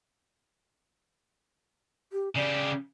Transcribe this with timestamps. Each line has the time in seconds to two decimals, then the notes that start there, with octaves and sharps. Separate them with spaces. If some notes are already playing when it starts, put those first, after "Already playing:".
2.13 G4
2.36 C#3 G4 D5